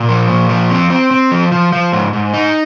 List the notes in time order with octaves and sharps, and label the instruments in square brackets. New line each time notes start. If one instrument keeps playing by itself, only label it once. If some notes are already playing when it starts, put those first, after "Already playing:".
Already playing: [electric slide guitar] A#2
F3
A#2
F3
C4
C4
C4
F3
F3
F3
G#2
G#2
D#4